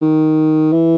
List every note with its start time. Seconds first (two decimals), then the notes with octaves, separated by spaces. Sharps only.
0.01 D#3
0.72 E3